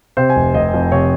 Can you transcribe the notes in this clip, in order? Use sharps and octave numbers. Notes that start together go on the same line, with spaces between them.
C3 C5
G#5
F1
F1 D#5
F2
C3 C#5